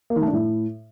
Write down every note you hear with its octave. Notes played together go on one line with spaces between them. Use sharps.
A#3
D#3
A3
D4
A2